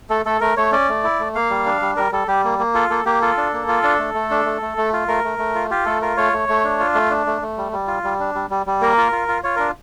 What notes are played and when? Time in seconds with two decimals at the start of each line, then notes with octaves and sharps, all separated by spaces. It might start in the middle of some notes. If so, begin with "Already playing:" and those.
0.10 A3 A4
0.26 A3 A4
0.41 A3 A#4
0.57 A3 C#5
0.72 C#4 D5
0.89 A3
1.04 E4
1.19 A3
1.35 A#3 F5
1.50 G3
1.66 D4
1.81 G3
1.96 G3 A#4
2.12 G3 A4
2.28 G3 G4
2.44 A#3
2.59 A#3
2.74 F4 A4
2.90 A#3 A4
3.05 A#3 G4
3.21 F4 A4
3.37 D4
3.53 A#3
3.68 F4
3.84 D4
3.99 A3
4.14 A3
4.31 D4
4.45 A3
4.62 A3
4.77 A3
4.93 F4
5.08 A3 A#4
5.24 A3
5.39 A3
5.55 F4
5.70 F4 G4
5.85 A3 A4
6.02 F4 A#4
6.17 A3 C#5
6.33 A3
6.49 A3
6.64 D4
6.80 F4
6.95 A3
7.10 D4
7.26 A3
7.42 A3
7.58 G3
7.72 G3
7.88 F4
8.04 G3
8.20 D4
8.35 G3
8.50 G3
8.66 G3
8.81 A#3 A#4
8.98 F4
9.12 F4
9.28 F4
9.43 F4 C#5
9.56 D4 A#4